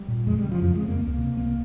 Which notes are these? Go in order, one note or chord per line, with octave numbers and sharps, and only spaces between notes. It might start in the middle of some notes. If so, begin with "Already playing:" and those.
Already playing: G3
A#2
F2 G#3
G3
C#3
F3
F2 F3
G#3
C#3
A#3
C#2 A#3
C3
C2 A#3